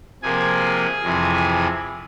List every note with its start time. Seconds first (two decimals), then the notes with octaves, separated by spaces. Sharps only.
0.23 C3 F3 A#3 G#4 G#5
1.03 F2 C3 E3